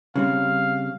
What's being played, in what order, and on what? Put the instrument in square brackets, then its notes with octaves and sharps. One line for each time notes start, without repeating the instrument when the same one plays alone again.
[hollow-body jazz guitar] C#3 G3 C4 [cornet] F5